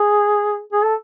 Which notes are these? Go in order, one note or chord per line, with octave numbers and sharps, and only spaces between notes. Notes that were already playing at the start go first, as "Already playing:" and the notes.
Already playing: G#4
G#4
A4